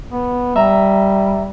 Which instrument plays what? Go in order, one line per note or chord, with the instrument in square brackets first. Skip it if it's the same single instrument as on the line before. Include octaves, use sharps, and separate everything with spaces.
[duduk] B3
[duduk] G3 [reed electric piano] E5 A#5